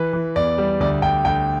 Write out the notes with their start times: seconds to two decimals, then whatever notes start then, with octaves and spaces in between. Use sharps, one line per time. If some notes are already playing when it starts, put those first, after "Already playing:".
Already playing: E3 B4
0.13 E3
0.36 E2 D5
0.58 G3
0.80 D2 D5
1.02 D2 G5
1.25 D2 G5